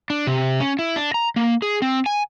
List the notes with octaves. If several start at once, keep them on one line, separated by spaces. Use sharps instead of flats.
D4
C3
C#4
E4
D4
A#5
A#3
G#4
C4
G#5